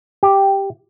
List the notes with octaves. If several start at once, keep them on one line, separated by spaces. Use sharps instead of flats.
G4